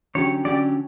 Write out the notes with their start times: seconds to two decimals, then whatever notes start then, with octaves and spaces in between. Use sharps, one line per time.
0.15 D3 F#3 C#4 G4 C#5
0.45 D3 F#3 C#4 G4 D5